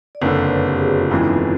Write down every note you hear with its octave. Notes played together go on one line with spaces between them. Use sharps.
D5
F#1 F2 D3 B4 C#5
B4 C#5
G4 A4
F#4 G#4
F4
G1 F2 C#3 E3 G#3 E4
D#4
F4